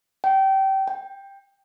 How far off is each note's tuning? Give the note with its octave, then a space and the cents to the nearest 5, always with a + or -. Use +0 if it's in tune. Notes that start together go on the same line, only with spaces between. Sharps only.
G5 -25
G5 +10